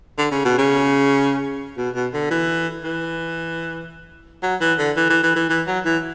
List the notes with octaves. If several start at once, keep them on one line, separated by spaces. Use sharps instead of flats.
D3
C#3
B2
C#3
B2
B2
D3
E3
E3
F#3
E3
D3
E3
E3
E3
E3
E3
F#3
E3